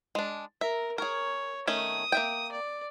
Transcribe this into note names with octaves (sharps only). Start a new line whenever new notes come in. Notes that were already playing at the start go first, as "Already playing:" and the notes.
G#3 D4
A#4 E5
G#4 A#4 C#5
D#3 A3 C#4 D#6
A#3 E5 G5
D5